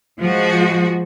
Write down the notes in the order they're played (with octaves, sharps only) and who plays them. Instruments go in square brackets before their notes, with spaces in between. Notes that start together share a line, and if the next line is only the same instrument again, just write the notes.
[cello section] F3 G#3 F#4